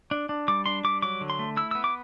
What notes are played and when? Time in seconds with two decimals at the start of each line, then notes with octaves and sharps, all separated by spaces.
0.11 D4
0.29 D4
0.48 G3 D6
0.66 D4 C6
0.84 G3 D6
1.02 F#3 D6
1.21 D3
1.30 C6
1.39 A3
1.57 E4 E6
1.71 B3 E6
1.84 D6